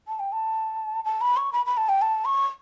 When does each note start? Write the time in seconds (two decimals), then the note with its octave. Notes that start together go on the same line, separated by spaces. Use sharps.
0.08 A5
0.20 G5
0.32 A5
1.05 A5
1.21 B5
1.37 C#6
1.53 B5
1.66 B5
1.77 A5
1.89 G5
2.02 A5
2.25 C#6